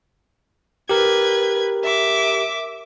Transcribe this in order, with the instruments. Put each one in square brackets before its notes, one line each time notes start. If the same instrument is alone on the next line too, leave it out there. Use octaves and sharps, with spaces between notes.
[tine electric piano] G4 A#4 [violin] B4 G#6
[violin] E5 D6